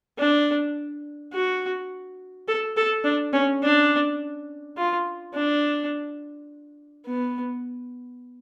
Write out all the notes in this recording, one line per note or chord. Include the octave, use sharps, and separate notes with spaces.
D4
F#4
A4
A4
D4
C#4
D4
F4
D4
B3